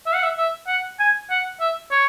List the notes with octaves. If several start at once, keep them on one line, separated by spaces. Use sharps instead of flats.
E5
F#5
E5
E5
F#5
G#5
F#5
E5
C#5